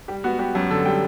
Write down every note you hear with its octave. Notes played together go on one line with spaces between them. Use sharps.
G3 G4
B3 F#4
B3 G4
F#2
D3 A4
G3 G5